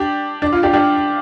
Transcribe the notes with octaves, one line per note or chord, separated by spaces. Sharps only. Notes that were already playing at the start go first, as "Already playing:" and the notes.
Already playing: D4 G4
D4
F4
D4 G4
D4 G4